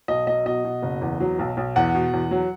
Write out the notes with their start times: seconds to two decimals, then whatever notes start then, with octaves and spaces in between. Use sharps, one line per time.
0.08 B1 D#5
0.27 F#3 D#5
0.46 B2 D#5
0.65 B2
0.83 F#1
1.02 E2
1.20 F#3
1.39 B1
1.57 B1
1.76 E2 F#5
1.94 B2
2.13 E2
2.31 F#3